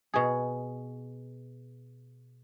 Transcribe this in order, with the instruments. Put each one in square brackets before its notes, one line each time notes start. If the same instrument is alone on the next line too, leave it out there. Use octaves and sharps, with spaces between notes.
[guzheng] B2 G#4